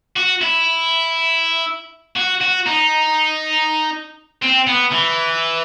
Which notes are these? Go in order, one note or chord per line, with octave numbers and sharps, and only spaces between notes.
F#4
E4
F#4
F#4
D#4
C4
B3
E3